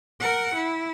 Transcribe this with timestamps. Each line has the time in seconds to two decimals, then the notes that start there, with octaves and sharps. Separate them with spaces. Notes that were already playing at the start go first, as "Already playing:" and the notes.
0.20 A#4 F#5
0.55 E4